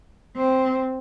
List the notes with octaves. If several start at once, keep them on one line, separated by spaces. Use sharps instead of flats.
C4